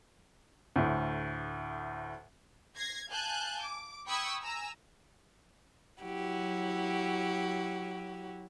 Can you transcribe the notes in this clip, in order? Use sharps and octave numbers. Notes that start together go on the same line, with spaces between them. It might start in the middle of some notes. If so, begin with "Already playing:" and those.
D2 A2
G#6 A#6 C7
F5 G#5 A5 F#6 G6
D6
G5 B5 C#6 D#6 E6 G#6
G#5 A#5 E6
F#3 E4 F#4 G4